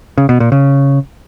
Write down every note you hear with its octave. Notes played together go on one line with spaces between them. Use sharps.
C#3
B2
A#2
C#3